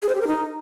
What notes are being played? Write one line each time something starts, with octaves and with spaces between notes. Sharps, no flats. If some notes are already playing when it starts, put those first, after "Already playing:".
G#4
C5
G4
A#4
D#4